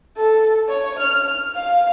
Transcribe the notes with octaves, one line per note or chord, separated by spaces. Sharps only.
A4
C#5
F6
F5